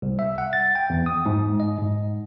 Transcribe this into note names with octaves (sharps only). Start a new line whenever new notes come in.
C2
E5
F#5
A6
G5
E2
D#6
G#2
D#5
G#2